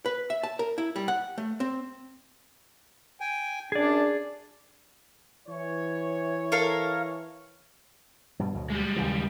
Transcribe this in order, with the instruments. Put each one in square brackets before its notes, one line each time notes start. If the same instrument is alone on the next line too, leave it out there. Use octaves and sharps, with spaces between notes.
[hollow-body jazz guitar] B4
E5
A5
A#4
E4
G3
F#5
A3
C4
[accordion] G5 G#5
[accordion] F#2 [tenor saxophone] D4 [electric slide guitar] G#4 D5
[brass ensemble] E3 C#5
[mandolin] A4 A#4 F5
[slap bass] G2 B2
D2 B2 F#3
[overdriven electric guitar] G3 G#3
[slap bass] D#2 C#3 E3